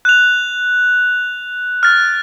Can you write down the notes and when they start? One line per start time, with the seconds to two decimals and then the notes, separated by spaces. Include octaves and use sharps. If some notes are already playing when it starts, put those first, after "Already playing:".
0.05 F#6 F7
1.83 F6 A6